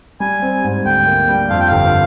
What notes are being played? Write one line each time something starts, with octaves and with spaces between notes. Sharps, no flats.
G3 G#5
C4
G#2
D2 G5
A#3
G3
F2 F5
G5
G1 F5